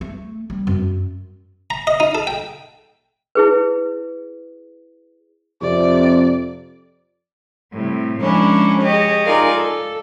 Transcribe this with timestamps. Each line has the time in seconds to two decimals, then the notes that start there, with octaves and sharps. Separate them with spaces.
0.01 A3
0.50 G3
0.67 F#2
1.70 A#5
1.87 D#5
2.00 D#4
2.15 A4
2.27 G5
3.35 E4 G#4 B4
5.62 F2 C3 D5
7.72 A2 C3 G3
8.20 F3 G#3 A#3 C#4 D4 E4
8.83 G4 G#4 C#5 D#5
9.26 D#4 F4 A#4 D5 F5 G#5
9.57 A4